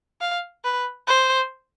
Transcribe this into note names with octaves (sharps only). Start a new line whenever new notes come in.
F5
B4
C5